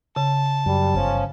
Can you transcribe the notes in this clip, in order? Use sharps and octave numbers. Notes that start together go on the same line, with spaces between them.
C#3 A5
F#2 G3
G1 F3 C#4